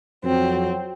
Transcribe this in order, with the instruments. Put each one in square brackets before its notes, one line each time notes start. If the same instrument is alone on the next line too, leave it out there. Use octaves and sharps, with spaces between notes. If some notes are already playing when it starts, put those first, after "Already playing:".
[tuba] F2 [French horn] F#3 [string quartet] C4